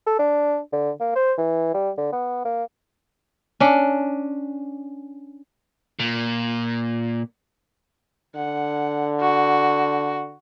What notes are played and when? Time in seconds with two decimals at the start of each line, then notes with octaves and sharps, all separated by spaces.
0.07 A4
0.19 D4
0.73 D3
1.00 A#3
1.16 C5
1.38 E3
1.74 G3
1.98 D3
2.12 B3
2.45 A#3
3.60 C#4 D4
5.99 A#2
8.36 D3 F#5
9.20 F#4